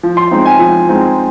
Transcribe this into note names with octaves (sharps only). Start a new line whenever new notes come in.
F3
C6
G#3 C4 D#4
G#5
F3
G#3 C4 D#4